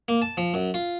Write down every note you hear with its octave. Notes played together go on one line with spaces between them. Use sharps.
A#3
A5
F3
F#2
F4